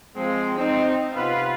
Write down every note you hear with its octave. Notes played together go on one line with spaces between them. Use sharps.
F3 G#3 C4
C4 D#4
C3 B3 F4 B4